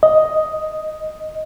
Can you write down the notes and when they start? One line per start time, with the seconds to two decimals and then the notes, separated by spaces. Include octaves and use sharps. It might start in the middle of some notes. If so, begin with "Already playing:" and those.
0.03 D#5